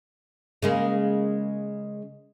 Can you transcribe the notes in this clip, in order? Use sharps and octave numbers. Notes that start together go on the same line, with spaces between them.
C#3 G#3 A#3